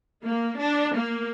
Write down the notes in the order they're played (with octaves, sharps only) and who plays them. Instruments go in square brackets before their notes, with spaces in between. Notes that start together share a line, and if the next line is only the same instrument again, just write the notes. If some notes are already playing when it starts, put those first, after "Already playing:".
[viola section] A#3
D4
A#3